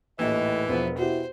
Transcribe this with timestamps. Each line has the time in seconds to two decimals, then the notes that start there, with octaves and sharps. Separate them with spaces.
0.19 A#1 D#2 A2 E3 D#5
0.69 E1 F3 B3
0.98 B2 E4 F#4 G4 C5